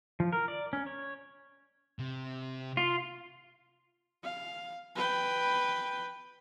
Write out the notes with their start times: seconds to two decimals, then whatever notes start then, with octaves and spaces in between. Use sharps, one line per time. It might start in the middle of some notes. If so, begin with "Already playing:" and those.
0.20 F3
0.33 A#4
0.48 D5
0.73 C#4
0.86 C#5
1.99 C3
2.77 F4
4.24 F5
4.96 B4 G5